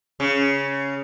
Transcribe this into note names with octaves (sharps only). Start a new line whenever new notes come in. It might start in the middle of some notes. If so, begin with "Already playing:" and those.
C#3